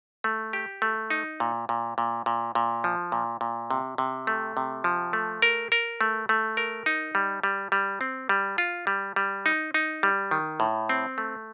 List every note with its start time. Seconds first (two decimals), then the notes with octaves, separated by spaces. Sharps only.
0.24 A3
0.53 G4
0.82 A3
1.10 D#4
1.40 A#2
1.69 A#2
1.98 A#2
2.26 A#2
2.55 A#2
2.84 F3
3.12 A#2
3.41 A#2
3.71 C3
3.98 C3
4.27 A3
4.57 C3
4.84 F3
5.13 A3
5.42 A#4
5.72 A#4
6.01 A3
6.29 A3
6.57 A#4
6.86 D#4
7.15 G3
7.44 G3
7.72 G3
8.01 C4
8.29 G3
8.58 F4
8.87 G3
9.16 G3
9.46 D#4
9.74 D#4
10.03 G3
10.31 D#3
10.60 A2
10.89 C4
11.18 A3